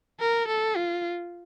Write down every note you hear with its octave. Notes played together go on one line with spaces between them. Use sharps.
A#4
A4
F4